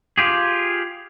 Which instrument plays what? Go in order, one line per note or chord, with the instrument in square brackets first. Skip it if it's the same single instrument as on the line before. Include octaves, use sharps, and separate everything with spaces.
[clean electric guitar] F4 G4 G#4